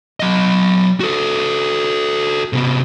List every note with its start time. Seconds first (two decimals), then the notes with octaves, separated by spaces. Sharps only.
0.20 F#3 D#5
1.00 F#4 A4
2.53 C3 B3